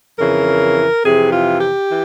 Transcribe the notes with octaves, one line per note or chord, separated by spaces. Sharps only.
F2 C#3 E3 A#4
F2 C3 E3 G#4
F4
G4
E3